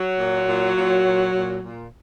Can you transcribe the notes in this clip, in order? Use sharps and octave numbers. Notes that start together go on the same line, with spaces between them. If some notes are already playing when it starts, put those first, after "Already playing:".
Already playing: F#3
A#2
A#2
A#2
A#2
A#2
A#2